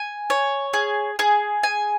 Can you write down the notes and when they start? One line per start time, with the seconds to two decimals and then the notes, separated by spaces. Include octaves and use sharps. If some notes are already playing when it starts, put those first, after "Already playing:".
Already playing: G#5
0.30 C#5
0.73 G#4
1.19 G#4
1.63 G#5